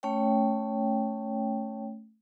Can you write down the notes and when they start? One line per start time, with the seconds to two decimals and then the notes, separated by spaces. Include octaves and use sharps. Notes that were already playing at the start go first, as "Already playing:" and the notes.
0.03 A3 C#4 C#5 G5